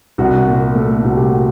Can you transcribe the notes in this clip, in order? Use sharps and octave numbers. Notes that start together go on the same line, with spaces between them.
C2 F#4
A#2
A3
C2 F#4
G4
F#4